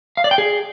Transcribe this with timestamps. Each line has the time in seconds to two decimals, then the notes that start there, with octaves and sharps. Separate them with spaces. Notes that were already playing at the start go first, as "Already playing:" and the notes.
0.17 F5
0.24 D5
0.31 G5
0.38 G#4